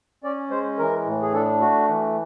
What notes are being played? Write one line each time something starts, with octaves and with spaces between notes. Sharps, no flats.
C#4 D5
G#3 C5
E3 A#4
A2
G#4
D4 A4
A3 F#4
E3